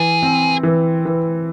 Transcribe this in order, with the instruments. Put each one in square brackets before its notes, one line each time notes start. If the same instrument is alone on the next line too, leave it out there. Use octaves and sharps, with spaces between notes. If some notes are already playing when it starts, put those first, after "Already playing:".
Already playing: [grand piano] E3 [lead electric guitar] G#4
[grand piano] C4
E3
E3